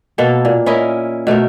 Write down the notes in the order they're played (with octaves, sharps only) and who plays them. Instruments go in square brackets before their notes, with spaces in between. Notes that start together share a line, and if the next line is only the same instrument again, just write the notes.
[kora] B2 A#3 A4
A#2
C#4 E4 A#4 D#5
B2 A3 D#4 A#4